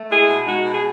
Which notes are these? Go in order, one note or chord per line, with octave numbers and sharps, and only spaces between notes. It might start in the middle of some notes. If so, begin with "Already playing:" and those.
Already playing: A3
G#3 E4 G#4
B2
G#3 D#4 F#4
B2
G#4